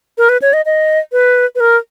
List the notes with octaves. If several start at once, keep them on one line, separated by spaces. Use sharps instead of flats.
A#4
B4
C#5
D#5
D#5
B4
B4
A#4